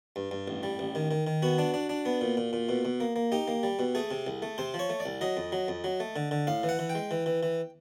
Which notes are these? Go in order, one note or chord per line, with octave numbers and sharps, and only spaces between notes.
G2
G2
A1
G3
A1
D#3
D#3
D#3
B3 F#4
D4
D4
D4
B3
A#2
A#2
A#2
B2
B2
A#3
A#3
D#4 G4
A#3
G3
B2
A3 G#4
C3
C2
A3
C3 C5
F3
C#5
A3
D5
C2
F#3 D#5
F2
F#3
F2
F#3
A3
D3
D3
A2 F5
E3
F#5
E3
G5
G#3
E3
E3
E3